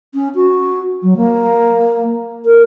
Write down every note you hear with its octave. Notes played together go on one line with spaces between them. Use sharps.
C#4
F#4
F#3
A#3
A#4